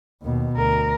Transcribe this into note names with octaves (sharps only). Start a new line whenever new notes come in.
D#2 B2
D2 A#4